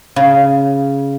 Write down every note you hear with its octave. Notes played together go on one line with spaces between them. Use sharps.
C#3